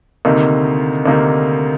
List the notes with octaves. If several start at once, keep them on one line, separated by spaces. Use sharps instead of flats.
D2 C3 D#3 A#3 D#4
D2 C3 D#3 A#3 D#4